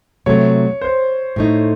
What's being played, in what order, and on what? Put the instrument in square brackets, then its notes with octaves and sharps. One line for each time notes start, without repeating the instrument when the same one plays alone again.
[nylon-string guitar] C3 F#3 A3 [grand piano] C#5
[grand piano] C5
[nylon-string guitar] A2 A3 D#4